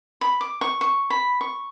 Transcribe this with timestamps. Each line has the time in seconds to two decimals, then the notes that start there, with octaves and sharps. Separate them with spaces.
0.21 B5
0.41 D6
0.61 C#6
0.81 C#6
1.10 B5
1.41 C#6